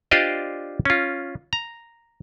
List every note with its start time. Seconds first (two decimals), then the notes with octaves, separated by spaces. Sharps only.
0.11 D4 F4 G4 C5 D5 D#5
0.85 C#4 F4
1.53 A#5